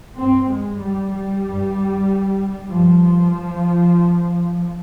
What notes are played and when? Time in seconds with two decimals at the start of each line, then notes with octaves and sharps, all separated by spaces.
0.19 G2 C4
0.51 G#3
0.81 G3
1.13 G3
1.45 G2
2.70 G2 F3